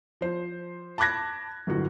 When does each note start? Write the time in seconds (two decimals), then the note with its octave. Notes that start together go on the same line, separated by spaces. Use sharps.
0.21 F3 C5
0.98 A5 B5 D6 F#6 G#6 A#6
1.67 G1 F#2 A2 F#4